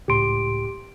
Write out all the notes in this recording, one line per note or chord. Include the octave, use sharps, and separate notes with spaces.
C#2 A2 G4 C6 D7